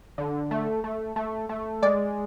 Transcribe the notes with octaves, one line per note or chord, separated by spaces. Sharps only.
D3
A3
A3
A3
A3
G#3 D5